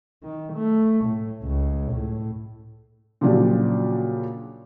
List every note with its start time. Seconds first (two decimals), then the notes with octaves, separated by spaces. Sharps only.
0.23 D#3
0.54 A3
1.05 A2
1.43 C#2
1.92 A2
3.21 A#2 C#3 F3 F#3 D4 G4